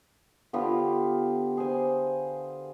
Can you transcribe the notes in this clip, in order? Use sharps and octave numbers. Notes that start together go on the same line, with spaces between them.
D3 B3 F4 G4
G#4 C5 G#5